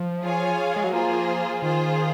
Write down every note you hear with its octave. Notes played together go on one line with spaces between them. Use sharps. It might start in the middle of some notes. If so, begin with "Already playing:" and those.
Already playing: F3
F4 G#4 C#5 F5 G#5
G#3
F#3
F3 A#3 F4 G#4 C5
D#3 F4 G#4 C5